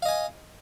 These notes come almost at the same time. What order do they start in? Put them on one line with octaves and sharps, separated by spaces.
F5 D#5 G#5